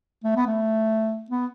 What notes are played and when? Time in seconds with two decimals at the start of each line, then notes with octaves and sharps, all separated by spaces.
0.24 A3
0.36 B3
0.47 A3
1.30 B3